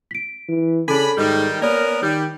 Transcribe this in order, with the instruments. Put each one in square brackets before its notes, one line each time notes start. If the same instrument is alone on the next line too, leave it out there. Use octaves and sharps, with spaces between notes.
[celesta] B6 D7
[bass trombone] E3
[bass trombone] C#3 [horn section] D4 G#5 B5 [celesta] A4
[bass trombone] G#2 [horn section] D#3 G3
[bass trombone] A#3 [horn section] B3 C#4 A#4 [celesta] D5
[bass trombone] D#3 [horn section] G3